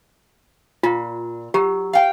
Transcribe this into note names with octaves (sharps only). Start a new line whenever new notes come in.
A#2 F4
F#3 G4
F5 G5